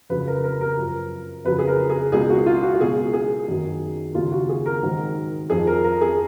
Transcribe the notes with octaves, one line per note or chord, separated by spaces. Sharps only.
F2 C#3 F#3 B4
A#4
A#4
A#4
F#2 F3
F2 C#3 F#3 B4
G#4
A#4
G#4
C#2 B2 F#3 G#4
F#4
F4
F#4
F#4
C#2 B2 F#3 G#4
G#4
F#2 D#3 F#3
D#2 C#3 F#3 F4
F#4
G#4
A#4
G#2 D#3 F#3
F2 F3 G#4
A#4
A#4
G#4